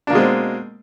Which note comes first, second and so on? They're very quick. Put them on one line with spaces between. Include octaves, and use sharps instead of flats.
D4 A#3 B2 G#3 C4